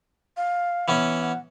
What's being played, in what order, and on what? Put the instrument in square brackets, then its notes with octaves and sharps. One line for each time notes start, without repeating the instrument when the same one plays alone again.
[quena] F5
[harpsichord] E3 B3 C#4
[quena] F#5